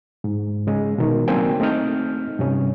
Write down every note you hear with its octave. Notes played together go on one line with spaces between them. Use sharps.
G#2
C#3 G#3
B2 D#3
F#3 A#3 C4 D4 G5 G#5
A3 C4 D#4 D#5 F6 G6
G2 C3 C#4